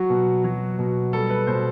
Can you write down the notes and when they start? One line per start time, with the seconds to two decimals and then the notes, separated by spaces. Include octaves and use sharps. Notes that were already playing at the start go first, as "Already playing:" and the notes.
Already playing: F#3 F#4
0.10 B2
0.44 F#3
0.79 B2
1.13 G3 A4
1.30 B4
1.47 B2 C5